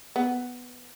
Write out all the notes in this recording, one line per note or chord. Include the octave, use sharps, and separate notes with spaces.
B3